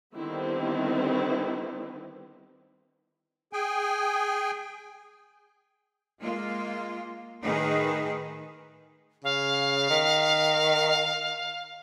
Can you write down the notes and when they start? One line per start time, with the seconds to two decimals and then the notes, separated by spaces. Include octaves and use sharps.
0.15 D3 D#3 G3 B3 C4 E4
3.53 G#4 G5 G#5
6.20 G#3 A#3 F4
7.44 A2 D#3 D#4 G#4 B4
9.24 C#3 F5
9.90 D#3